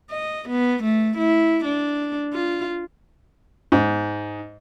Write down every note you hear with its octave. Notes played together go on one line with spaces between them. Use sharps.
D#5
B3
A3
E4
D4
F4
G#2